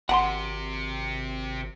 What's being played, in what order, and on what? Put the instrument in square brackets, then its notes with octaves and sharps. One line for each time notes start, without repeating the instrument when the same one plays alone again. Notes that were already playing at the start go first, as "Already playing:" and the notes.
[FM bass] G#1 [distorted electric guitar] C3 [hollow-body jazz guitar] F#5 A5 C6